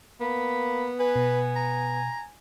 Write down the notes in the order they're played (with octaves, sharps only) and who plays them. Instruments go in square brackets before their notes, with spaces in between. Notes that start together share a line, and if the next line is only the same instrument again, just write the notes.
[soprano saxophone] A#3 [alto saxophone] B3 [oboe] B5
[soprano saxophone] B4 [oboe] G#5
[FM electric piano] B2
[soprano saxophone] A#5